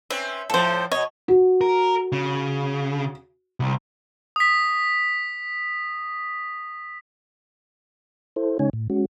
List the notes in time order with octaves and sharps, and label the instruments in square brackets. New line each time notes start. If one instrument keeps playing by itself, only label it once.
[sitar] C4 C#4 B4 [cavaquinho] E5
[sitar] A2 F3 [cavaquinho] A4 C5
[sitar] B2 D#5 [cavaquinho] C#5
[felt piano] F#4
[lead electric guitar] A#4
C#3
C2
[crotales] D#6 B6
[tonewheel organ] E4 A4 C5
C#3 G#3 C#4 D#4 C#5 G#5
A2
G#3 C#4 F#4